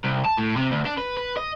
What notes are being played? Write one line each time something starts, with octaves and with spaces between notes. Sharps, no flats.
C2
A5
A2
C3
D2
D4
B4
B4
D#5